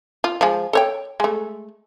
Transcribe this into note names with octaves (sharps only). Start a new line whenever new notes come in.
F4
F3 G#3
A4 C#5 G5
G#3 A3